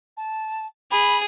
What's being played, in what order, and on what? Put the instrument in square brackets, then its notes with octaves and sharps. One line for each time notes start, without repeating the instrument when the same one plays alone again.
[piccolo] A5
[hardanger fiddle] G#4 [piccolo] B5